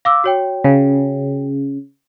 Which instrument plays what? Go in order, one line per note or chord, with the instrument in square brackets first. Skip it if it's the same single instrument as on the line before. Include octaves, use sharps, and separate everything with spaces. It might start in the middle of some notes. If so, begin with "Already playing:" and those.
[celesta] F5 D6 E6
F#4 C#5 G5
[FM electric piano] C#3